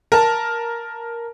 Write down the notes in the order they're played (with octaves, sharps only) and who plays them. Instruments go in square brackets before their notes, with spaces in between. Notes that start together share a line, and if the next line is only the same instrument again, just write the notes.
[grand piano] A#4 A5